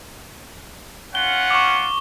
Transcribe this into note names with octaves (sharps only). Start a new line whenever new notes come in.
C#4 F4 F#5 G7
C#6 D6